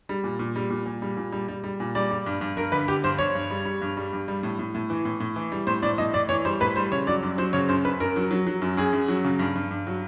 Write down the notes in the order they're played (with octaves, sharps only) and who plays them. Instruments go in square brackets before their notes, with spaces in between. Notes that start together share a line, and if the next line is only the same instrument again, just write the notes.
[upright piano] G3
A#2
A#2
G3
A#2
A#2
G3
A#2
G3
G3
G3
A#2
G3 D5
G3
G2
G2
G2 A#4
D3 B4
D3 G4
G2 C5
G2 C#5
G2
G3
G3
G2
G3
G2
G3
A2
A2
A2
E3
A2
A2
E3
G3
A2 C5
A2 D5
A2 D#5
A2 D5
E3 C#5
G3 C5
A2 B4
G3 C5
C#3 C#5
F#3 D5
F#2
F#3 C5
C#3 C#5
F#2 C5
F#2 B4
F#2 A#4
F#3
F#3
F#3
F#2
F#2 G#4
F#2
F#3
C#3
G2
G2
G2
F#3